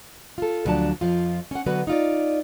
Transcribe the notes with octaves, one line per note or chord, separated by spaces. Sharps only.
F4 A4
D2 F3 F#3 D4 A5
F2 F3 F4
C#4 F#5
D3 F#3 B3 F#4 B4
D#4 F4 D5